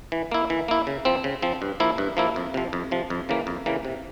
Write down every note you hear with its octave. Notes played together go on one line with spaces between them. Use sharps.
E3
A#3 E4
E3
A#3 E4
C#3
F3 C4
C#3
F3 C4
G2
F3 A#3 E4
G2
F3 A#3 E4
F2
C3 F3
F2
C3 F3
F2
C#3 E3 A#3
F2
C#3 E3 A#3
C3